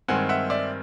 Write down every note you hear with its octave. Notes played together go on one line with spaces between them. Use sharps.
G2 D#3 G#3 C4 F#5 G#5
E5 F#5
D5 E5